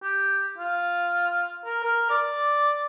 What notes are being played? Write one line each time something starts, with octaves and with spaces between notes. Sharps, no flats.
G4
F4
A#4
A#4
D5